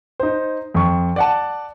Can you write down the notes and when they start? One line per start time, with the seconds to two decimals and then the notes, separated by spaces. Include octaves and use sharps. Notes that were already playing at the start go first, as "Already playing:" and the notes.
0.20 D#4 C5
0.74 F2 C#6
1.16 D5 F#5 A5